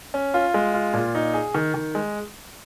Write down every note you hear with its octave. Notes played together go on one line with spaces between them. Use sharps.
C#4
F4
G#3
F4
A#2
D#4
G#4
D#3
D#3
G#3